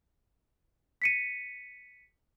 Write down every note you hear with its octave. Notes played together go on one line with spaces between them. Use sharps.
B6 C#7 D#7